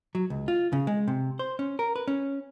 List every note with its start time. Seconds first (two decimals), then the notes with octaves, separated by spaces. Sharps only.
0.15 F#3
0.30 C#2
0.48 F4
0.73 C#3
0.87 G#3
1.08 C3
1.39 C5
1.59 C#4
1.79 A#4
1.96 B4
2.08 C#4